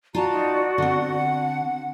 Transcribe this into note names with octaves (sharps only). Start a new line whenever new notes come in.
F4 F#4 D5 A5 A#5
D#4
D3 C4 F#5